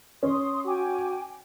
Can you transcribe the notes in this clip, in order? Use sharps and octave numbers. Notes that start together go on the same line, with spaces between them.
C#4 C6 D#6
F#4 G5 G#5 D6